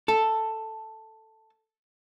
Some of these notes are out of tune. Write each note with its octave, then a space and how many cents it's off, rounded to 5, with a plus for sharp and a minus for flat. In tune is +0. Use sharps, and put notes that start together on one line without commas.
A4 +5